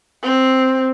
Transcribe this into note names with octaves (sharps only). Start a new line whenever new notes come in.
C4